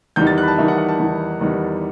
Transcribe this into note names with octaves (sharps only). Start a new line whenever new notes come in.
E2 D#3 G3 D#4 G6
A6
F#6
B5
A5
E2 D#3 G3 D#4 E5
F#5
F#5
A5
E2 D#3 G3 D#4
E2 D#3 G3 D#4